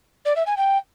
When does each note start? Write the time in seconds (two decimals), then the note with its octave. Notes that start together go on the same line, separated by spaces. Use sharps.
0.25 D5
0.35 E5
0.46 G#5
0.56 G5